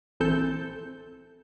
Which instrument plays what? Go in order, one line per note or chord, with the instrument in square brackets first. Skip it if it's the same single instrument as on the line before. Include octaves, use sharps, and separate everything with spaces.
[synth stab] A#1 E3 C4 A4 G6